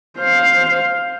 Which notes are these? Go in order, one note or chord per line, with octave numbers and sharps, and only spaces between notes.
C5 F5